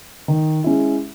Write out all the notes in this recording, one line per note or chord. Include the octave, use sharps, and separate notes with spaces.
D#3
G#3 C#4 E4